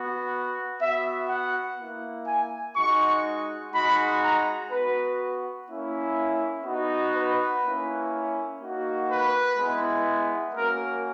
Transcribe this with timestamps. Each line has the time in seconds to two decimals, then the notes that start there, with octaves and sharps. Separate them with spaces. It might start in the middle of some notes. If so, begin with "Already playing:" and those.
Already playing: B3 F#4
0.80 B3 F#4 E5
1.28 F#5
1.78 A#3 E4
2.26 G#5
2.76 G#3 D#4 F#4 C#6
3.72 G#3 D#4 F#4 B5
4.22 A#5
4.70 B3 F#4 B4
5.67 A#3 C#4 E4
6.65 B3 D#4 F#4
7.14 B4
7.62 A#3 C#4 E4
8.61 A#3 D#4 F#4
9.09 B4
9.58 G#3 B3 E4
10.55 A#3 C#4 F#4 A#4